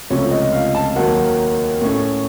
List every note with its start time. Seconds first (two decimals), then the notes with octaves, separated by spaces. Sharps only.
0.10 C#2 C3 F3 A3 C#4 C#5
0.31 D#5
0.53 F5
0.75 A5
0.96 D#2 D#3 F#3 A#3 F#5
1.81 A2 A3 C#4